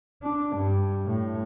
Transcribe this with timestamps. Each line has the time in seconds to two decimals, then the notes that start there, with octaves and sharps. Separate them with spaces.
0.23 D4
0.57 G2
1.06 A2